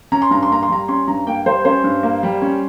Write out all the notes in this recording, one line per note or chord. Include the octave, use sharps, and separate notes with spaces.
C#4 A#5
C6
G2 A#5
C6
A#3 A#5
C6
G3 A#5
C#4 C6
G2 A#5
A#3 G5
G3 C5
C#4 C5
G2
A#3
G3
C#4